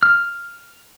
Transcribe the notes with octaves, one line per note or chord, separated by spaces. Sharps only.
F6